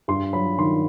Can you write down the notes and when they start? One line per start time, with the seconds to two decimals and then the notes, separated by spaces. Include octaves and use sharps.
0.08 G2 C6
0.33 F#3 B5
0.59 D#3 C6